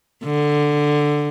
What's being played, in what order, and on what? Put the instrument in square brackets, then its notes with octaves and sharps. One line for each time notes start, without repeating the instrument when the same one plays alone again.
[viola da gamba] D3